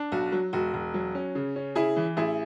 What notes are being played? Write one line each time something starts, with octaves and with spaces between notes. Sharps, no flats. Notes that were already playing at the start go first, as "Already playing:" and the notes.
Already playing: D4
B1 F#4
F#3
E1 F#4
E1
F#3
C#4
C#3
C#4
C#3 E4 G#4
E3
A1 E4 G#4